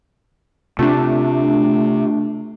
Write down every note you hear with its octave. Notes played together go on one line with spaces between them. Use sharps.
C3 A3 D4 F4